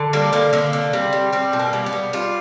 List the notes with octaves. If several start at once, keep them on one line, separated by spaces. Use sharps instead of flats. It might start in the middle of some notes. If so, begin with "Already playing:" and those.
Already playing: D3
G3 A#3
D3 A#3
D3 A#3
D3
G3 C4
G3
G3 C4
B2
A#3
G3
B3
G3
G3 F4